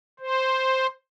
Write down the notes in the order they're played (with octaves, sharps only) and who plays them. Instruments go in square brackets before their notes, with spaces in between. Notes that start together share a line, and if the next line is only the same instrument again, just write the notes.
[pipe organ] C5